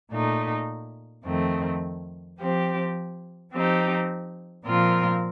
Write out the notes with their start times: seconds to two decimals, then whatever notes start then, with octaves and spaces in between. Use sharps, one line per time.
0.11 A#2 A3 D#4
1.25 F2 D#3 A3 C4
2.39 F3 C4 G4
3.52 F3 C4 D#4 G4
4.65 A#2 F3 C4 F4 A#4